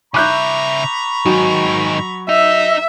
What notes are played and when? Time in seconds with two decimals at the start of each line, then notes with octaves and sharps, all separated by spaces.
0.14 C#3 E5 A#5 B5 C#6 D6 F#6 G6
1.26 G#2 D#3 F#3
2.29 D#4 E5